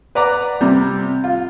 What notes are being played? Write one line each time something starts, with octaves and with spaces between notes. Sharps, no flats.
B4 D5 F#5 A#5 D6
C3 G3
F4